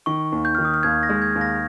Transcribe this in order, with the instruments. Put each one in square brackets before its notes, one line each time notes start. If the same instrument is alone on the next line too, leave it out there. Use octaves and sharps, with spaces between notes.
[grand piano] D#3 [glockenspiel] C#6
[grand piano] D#2
[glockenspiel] G6
[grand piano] D#3 [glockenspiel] F6
[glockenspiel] D#6
F6
[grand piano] D#2 [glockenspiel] G#6
[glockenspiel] A#6
[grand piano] G#3
[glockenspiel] G#6
[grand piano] D#2
[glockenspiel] A#6